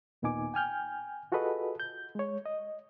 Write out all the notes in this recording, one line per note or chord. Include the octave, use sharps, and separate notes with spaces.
D#2 A#2 B3 D#4 G#5 D6
G5 G#5 F6 G6
F4 F#4 G#4 A4 B4 D#5
G6
G#3 C#5
D#5